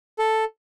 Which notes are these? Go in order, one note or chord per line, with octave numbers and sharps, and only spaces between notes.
A4